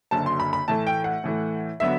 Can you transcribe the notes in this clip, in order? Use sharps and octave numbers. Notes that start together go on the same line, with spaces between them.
F#1 F#2 D3 A5
C6
B5
B5
A2 E3 A3 A5
G5
F#5
A2 E3 A3
D3 F#3 B3 E5